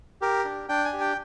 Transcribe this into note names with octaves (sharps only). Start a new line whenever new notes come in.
G4 A#4
D4
D4 G5
G#5
G4
G5